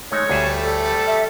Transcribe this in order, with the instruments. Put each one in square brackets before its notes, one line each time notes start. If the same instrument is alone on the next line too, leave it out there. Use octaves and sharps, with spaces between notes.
[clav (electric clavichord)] G#3 A3 D#4 [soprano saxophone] C#5
[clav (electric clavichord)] D2 G#4 E5 [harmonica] G3 A3
[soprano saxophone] A4
[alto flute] E5